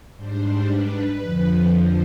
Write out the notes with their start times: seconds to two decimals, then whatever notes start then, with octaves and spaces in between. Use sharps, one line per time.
0.15 G#2 G3 D4 C5
0.68 B4
1.21 F2 D3 F3
1.74 C5